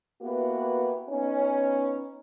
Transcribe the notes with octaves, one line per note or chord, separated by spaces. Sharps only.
A#3 B3 E4 F#4 G4 B4
B3 C#4 D#4